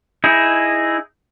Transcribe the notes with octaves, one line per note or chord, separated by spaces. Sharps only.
D#4 E4 G#4